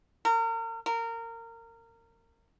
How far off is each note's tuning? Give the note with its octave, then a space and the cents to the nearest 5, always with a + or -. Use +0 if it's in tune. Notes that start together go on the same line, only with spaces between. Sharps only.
A#4 -35
A#4 -25